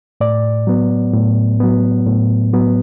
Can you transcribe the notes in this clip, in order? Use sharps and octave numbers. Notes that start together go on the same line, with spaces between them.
A2 D5
F#3 B3
A2
F#3 B3
A2
F#3 B3